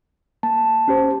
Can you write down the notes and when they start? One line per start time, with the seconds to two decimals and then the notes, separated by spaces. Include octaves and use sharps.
0.43 A#3 A5
0.88 C#4 G4 C5